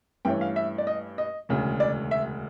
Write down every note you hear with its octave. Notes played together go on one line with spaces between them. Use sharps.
G2 E3 A3 C#4 G5
F5
E5
D5
D#5
D#5
E1 D2 C#3
D5
E5